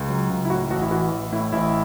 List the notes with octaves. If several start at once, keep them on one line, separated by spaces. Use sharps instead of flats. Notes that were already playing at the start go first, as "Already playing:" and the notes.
Already playing: C#2
F#3
C#2
E4
A2 F#4
A1 F#4
E4
E3 F#4
A1
A2 E4
A1 E4